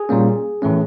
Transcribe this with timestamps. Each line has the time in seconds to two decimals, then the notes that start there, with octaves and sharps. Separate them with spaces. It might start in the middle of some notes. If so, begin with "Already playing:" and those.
Already playing: G#4
0.09 A#2 G3 A#3 C#4
0.62 A2 E3 A3 C#4